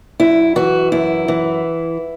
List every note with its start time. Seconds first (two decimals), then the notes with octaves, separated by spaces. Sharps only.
0.20 F#2 E4
0.56 E3 F#4
0.92 F#2 E4
1.28 E3